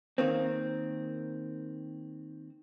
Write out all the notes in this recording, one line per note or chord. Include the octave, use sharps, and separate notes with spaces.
D#3 A#3 C4